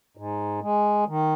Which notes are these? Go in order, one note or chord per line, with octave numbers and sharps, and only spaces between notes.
G#2
G#3
D#3